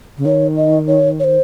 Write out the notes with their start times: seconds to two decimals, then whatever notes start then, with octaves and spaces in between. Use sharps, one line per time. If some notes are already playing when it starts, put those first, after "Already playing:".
0.18 C#3
0.25 D#3 C#5
0.57 D#5
0.87 C#5
1.20 C#5
1.24 C5